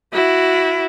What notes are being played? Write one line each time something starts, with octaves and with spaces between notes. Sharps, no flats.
E4 F#4